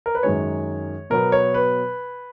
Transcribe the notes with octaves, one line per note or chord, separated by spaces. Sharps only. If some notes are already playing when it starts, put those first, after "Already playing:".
A#4
B4
F#2 D#3 G#3 C#5
B2 F#3 B3 A#4
C#5
B4